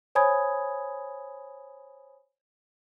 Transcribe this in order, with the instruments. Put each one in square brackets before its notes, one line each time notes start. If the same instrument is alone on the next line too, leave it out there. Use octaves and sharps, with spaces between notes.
[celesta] C5 C#5 G#5 B5 D#6 G#6